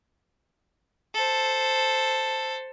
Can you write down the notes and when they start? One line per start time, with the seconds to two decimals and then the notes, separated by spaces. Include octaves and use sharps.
1.14 A4 C5